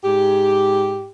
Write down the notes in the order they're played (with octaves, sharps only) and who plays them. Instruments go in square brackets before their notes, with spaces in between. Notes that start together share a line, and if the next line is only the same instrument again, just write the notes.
[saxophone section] G#2 G4